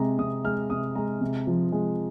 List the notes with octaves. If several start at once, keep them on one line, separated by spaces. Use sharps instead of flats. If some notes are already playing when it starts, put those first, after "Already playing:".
Already playing: C3 G#3 A#5
C3 D#6
G#3 F6
C3 D#6
G#3 A#5
C3
F3
G#3